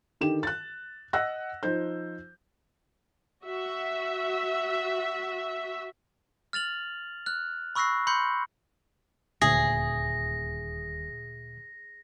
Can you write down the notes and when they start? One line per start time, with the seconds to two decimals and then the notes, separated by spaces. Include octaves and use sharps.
0.21 D3 D#3 G4 E7
0.43 F#6 A6
1.13 D#5 F#5 E6 F#6 A#6
1.63 F3 D#4 C5 G6
3.45 F#4 E5
6.53 F6 A6 F7 F#7
7.26 F6 F#6
7.75 B5 C#6 E6 F#6 A#6 C7
8.07 B5 C6 G6 C#7
9.41 D#1 D2 A#2 G#4 E5 A#6